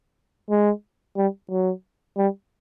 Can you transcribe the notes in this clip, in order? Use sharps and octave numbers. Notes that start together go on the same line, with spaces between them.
G#3
G3
F#3
G3